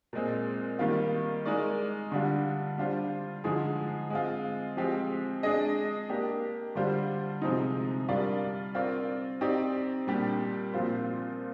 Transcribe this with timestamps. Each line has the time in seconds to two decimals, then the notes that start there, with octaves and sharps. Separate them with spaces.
0.13 A#2 G#3 C4
0.79 D#3 G3 A#3 F4
1.45 G#3 D#4 A#4 D5
2.12 D3 G3 D4 F4
2.78 G3 D4 F4 C5
3.44 D3 F3 G#3 D#4 G#4
4.10 G#3 C4 F4
4.77 F3 G#3 C4 G4
5.43 G#3 D4 G#4 D#5
6.09 A#3 D4 G4
6.75 D3 G3 D4 F4 C5
7.42 C3 F3 G#3 C4 D#4
8.08 G3 D4 F4 A#4 D5
8.75 C4 F4 A#4 D5
9.41 C4 D#4 G4 D5
10.07 A#2 G3 D4 G4
10.74 A#2 F3 C4 F4 C5